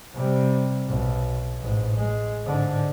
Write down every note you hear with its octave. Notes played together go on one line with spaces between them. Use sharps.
C3 G3
B1
A1 G#2
G#3
G#2 D3